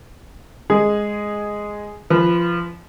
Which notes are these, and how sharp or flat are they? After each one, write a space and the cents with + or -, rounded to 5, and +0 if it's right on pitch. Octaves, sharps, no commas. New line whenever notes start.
G#3 +0 G#4 +0
F3 -20 B4 +0